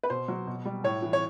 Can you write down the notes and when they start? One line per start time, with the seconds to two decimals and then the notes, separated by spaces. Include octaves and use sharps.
0.03 B4
0.10 B2 C5
0.28 F#3
0.47 B2
0.65 G3
0.84 A2 C#5
1.02 E3
1.13 C#5